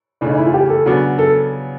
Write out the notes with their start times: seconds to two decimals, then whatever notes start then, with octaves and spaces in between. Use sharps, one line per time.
0.21 E2 C#3 E3 A3 D4
0.30 D#4
0.38 E4
0.46 F4
0.54 G4
0.70 A4
0.86 C#3 F#3 B3 D4 F#4
1.18 A4